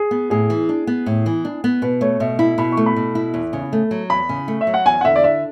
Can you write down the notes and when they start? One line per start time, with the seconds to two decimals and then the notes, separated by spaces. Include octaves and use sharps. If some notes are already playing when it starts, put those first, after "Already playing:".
Already playing: G#4
0.11 B3
0.30 A2 G#4
0.50 E3
0.69 D4
0.87 B3
1.06 A2
1.26 E3
1.45 D4
1.64 B3
1.82 B2 B4
2.01 A3 C#5
2.20 B2 E5
2.39 E4 E5
2.58 B2 B5
2.72 C#6
2.77 A3
2.86 B5
2.96 B2
3.15 E4
3.34 E2
3.53 C#3
3.73 A3
3.91 F#3
4.10 E2 B5
4.29 C#3
4.48 A3
4.61 E5
4.67 F#3
4.74 F#5
4.86 E2 G#5
5.01 F#5
5.05 D3 E5
5.16 D5
5.24 D4 E5